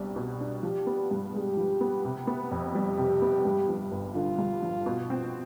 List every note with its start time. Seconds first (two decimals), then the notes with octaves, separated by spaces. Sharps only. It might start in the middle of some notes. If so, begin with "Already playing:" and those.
Already playing: C2 B2 G3 D4
0.16 B2
0.41 D4
0.63 F3 G4
0.87 B3
1.11 G2
1.34 G#3 G4
1.57 F3
1.81 B3
2.05 C3
2.27 B3
2.51 F2
2.75 G3 G4
2.98 C3
3.22 B3
3.45 G2
3.68 F3
3.92 G1
4.16 D3 F4
4.39 G2
4.63 F3
4.86 B2
5.10 C4